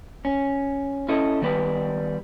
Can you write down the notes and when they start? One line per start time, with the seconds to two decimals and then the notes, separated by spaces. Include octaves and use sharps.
0.25 C#4
1.09 C#4 E4 A4 D#5
1.42 D#3 G3 B3 B4 C#5 D5